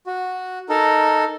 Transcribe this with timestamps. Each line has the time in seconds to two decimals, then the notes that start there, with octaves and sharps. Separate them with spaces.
0.07 F#4
0.69 D#4 A4 A#4